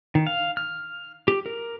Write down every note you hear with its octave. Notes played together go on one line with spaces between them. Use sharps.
D#3
F5
F6
G4
A#4